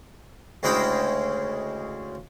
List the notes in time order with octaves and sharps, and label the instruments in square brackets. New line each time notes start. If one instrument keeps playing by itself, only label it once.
[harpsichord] D2 C#3 G#3 E4 D#5 G5